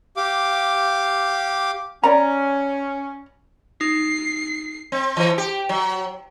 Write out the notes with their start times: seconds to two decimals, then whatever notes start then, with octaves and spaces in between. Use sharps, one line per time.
0.17 G4 F5 D6
2.04 C#4 D5 A#5
3.81 D#4 C7
4.92 C4
5.17 E3
5.38 G4
5.69 F#3